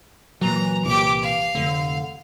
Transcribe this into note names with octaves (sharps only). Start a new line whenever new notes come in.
A#2 E3 F#3 A#5
C2 A#2 G4 D6
F5
F1 D3